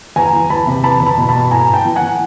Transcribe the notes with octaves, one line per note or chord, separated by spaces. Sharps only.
E2 G#5 A#5
E3
E2 A5 B5
C3
E2 A5 B5
E2
A5 B5
B2
A5 B5
B2
A2 G#5 A#5
A2
G5 A5
E3
F#5 G#5
E3